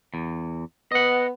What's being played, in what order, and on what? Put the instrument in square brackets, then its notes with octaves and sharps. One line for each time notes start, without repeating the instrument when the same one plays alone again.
[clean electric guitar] E2
[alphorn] B3 [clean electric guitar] D#5 F#5